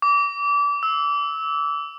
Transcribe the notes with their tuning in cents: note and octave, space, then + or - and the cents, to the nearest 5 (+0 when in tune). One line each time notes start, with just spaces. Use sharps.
D6 -30
E6 -20